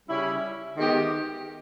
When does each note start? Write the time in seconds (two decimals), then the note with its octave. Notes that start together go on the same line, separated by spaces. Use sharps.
0.09 C#3 G3 C#4 E4
0.77 D#3 G#3 B3 G4